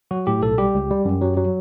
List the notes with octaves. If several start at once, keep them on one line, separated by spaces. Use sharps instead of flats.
F#3 F#4
A2 G4
B1 A4
G3 G4
C#2
G3
F#2
F#3
F#3